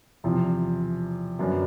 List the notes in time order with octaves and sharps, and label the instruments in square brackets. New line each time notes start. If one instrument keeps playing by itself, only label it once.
[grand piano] E2 C3 F3
F#2 D3 F#3 B3 D4